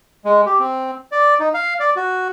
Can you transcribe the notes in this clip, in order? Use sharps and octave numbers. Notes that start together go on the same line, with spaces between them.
G#3
G4
C4
D5
D#4
F5
D5
F#4